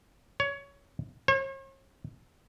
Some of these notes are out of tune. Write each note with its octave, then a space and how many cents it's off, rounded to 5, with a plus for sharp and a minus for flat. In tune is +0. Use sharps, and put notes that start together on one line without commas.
C#5 +20
C#5 -45